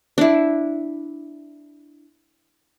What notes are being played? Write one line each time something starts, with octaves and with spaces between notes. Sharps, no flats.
D4 E4